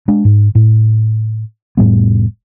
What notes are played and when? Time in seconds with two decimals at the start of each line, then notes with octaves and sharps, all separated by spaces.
0.08 G#3 D4
0.25 G#2
0.55 A2
1.77 F1 A2 G3 B3